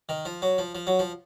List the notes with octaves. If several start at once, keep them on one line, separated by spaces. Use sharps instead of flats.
D#3
F3
F#3
F3
F3
F#3
F3